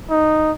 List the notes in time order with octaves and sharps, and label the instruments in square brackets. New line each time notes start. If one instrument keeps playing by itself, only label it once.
[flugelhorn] D#4